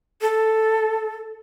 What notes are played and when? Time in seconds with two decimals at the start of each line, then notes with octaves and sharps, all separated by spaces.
0.22 A4